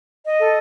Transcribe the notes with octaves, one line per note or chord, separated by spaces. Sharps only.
D#5
A4